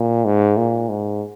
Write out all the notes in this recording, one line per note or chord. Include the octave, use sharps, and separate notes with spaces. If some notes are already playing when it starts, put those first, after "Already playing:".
Already playing: A#2
G#2
A#2
G#2